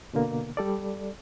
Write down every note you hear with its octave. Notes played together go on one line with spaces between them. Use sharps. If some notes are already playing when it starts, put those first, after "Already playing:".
B2 D3 A#3
G3 A4 D5